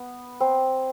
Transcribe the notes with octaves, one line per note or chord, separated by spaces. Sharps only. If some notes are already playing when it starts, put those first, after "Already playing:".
Already playing: B3
C4